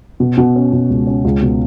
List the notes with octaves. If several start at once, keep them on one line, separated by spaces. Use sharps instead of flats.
B2
B2
C#4
B2
C#2
C#4
C#2
B2